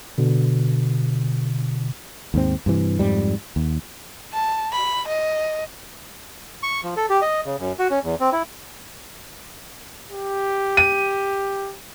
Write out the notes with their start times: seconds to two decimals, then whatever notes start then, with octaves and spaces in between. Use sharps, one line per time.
0.18 B2 D3
2.34 D#2 G#2 C4
2.66 G2 C3 E3
2.99 F2 G#2 G3
3.56 D#2
4.33 A5
4.73 B5
5.08 D#5
6.63 C#6
6.83 F3
6.97 A4
7.10 G4
7.22 D#5
7.45 C#3
7.59 F#2
7.79 F#4
7.91 C#4
8.04 E2
8.20 C4
8.32 E4
10.11 G4
10.77 D#7